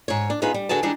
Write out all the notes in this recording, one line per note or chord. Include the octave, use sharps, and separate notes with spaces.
G#2 C#5
D4
B3 D#4 F4 G#4 B4
G3
D3 F#4 G#4 B4 A5
E3 G3 G#3 D4 D#4